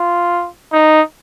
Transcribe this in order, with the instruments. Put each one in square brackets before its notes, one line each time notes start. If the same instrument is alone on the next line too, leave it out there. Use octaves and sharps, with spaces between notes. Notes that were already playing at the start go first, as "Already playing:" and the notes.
Already playing: [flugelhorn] F4
D#4